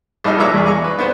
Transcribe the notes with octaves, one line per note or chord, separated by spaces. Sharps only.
A#1 G3 D#4 A4 F6
A#2 B4 C#5 E5 A#5 D6
E2 G#4
D5 A#5 C#6
B4
B3 D4 B4 C5